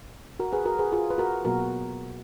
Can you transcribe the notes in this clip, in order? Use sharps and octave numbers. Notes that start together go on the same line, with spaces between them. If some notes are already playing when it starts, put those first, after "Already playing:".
Already playing: A#2
F#4 A#4
G#4 B4
F#4 A#4
G#4 B4
F4 G#4
B4
F#4 A#4
B2 F#3 A#3 F#4 A#4